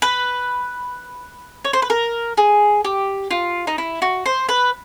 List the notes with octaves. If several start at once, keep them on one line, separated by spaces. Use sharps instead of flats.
B4
C#5
C5
B4
A#4
G#4
G4
F4
D#4
E4
F#4
C5
B4